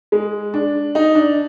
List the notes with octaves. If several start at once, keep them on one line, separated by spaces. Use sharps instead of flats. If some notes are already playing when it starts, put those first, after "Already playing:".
G#3
D4
D#4
D4